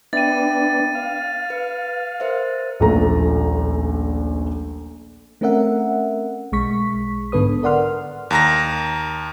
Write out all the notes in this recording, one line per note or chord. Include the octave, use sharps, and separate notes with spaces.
B3 D4 E5 G5 A6 D#7
F5
B4
A#4 C5 E5
D#1 A#1 F3 A3 A#5
A3 C4 C#4 A#4 E5 F#5
B1 G#3 C#6 B6
G#2 D3 B3 A4 B4 D#6
A#4 D5 F#5 C6 F6
D#2 A#5 A#6